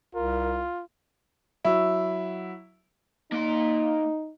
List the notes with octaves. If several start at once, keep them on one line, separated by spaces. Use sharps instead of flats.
C2 F4 A#4
F#3 E4
A#3 D#4 C6